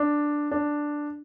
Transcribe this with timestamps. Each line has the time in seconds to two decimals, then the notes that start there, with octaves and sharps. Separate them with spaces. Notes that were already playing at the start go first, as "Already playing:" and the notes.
Already playing: D4
0.51 D4